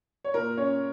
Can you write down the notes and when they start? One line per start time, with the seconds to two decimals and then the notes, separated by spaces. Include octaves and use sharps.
0.24 C#5
0.34 A#2 A#4
0.57 C#4 C#5